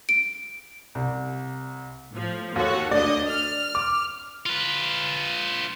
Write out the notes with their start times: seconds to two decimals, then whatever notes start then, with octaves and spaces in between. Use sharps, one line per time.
0.09 D7
0.95 C2
2.11 A2 F3
2.56 D#2 F#4 A4 C#5
2.91 D2 D4 D5 D#5
3.28 F6
3.75 D6
4.46 F4 B4